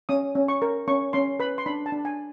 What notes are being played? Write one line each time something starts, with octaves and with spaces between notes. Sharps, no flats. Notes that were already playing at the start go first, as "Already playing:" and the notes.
C#4 D#6
C#4
C#6
A#4
C#4 C#6
C#4 C6
B4 B5
C6
D4 B5
A5
D4
G#5